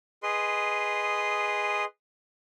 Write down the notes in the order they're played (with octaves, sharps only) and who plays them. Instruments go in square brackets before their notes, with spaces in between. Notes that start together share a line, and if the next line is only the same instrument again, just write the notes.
[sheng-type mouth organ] G#4 B4 D#5 C6